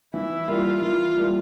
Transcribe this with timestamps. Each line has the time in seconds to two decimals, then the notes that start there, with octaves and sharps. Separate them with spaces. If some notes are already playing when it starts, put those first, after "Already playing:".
0.14 E3 E4
0.48 G3 A#3 E4 F4
0.82 E3 F4
1.17 G3 A#3 E4